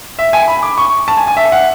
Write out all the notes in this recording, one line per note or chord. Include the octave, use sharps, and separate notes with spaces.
E5
G#5
B5
D6
C#6
A5
G#5
G#5
E5
F#5